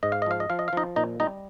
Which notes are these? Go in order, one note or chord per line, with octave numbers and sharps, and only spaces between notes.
G#2 D#5
F5
D#5
F3 F5
D#5
F3 F5
D#5
F5
F3 D#4 D#5
A#2 D#4 D#5
G3 D#4 D#5